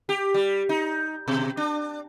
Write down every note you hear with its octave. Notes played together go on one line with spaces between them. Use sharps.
G4
G3
D#4
B2
D4